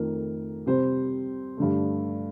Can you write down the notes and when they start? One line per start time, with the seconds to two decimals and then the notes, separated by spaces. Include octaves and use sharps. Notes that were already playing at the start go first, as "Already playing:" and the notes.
Already playing: F2 D#3 A3 A#4
0.66 C3 G3 C4 C5
1.57 G2 D3 A3